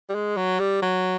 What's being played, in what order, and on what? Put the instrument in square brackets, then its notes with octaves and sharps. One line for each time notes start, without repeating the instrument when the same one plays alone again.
[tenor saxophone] G3
G#3
F#3
G3
F#3